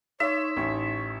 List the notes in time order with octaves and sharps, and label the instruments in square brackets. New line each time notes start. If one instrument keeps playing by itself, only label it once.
[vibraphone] D#4 C6 [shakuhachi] C#5 [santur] E5
[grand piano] A1 [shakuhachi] C#6